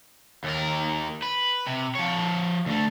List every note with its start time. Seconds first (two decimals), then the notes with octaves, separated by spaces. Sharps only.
0.44 D#2 A#4
1.22 B4
1.67 C3
1.95 F3 C#5
2.66 D2 A3